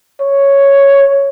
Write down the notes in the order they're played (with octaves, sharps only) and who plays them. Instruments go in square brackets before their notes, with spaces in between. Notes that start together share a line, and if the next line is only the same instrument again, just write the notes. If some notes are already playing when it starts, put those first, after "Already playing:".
[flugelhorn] C#5